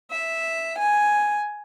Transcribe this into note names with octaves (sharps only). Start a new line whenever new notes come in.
E5
G#5